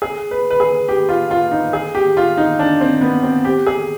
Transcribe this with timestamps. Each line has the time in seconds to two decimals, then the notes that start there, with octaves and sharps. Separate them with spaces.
0.02 G#4
0.31 B4
0.50 B4
0.60 G#4
0.89 G4
1.09 F4
1.31 F4
1.51 D#4
1.73 G#4
1.95 G4
2.17 F4
2.37 D#4
2.59 D4
2.81 C4
3.01 B3
3.23 C4
3.45 G4
3.67 G#4